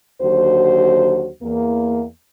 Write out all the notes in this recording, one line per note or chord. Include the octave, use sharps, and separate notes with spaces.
D#2 D3 F#3 F#4 C5
E2 A#3